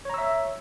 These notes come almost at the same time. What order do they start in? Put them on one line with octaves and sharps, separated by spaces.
C#5 A#5 E6 E5